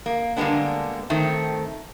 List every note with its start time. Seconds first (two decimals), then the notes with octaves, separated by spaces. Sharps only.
0.06 A#3
0.36 D3 G3 G#3 A#3 B3 D4
1.10 D#3 A3 C4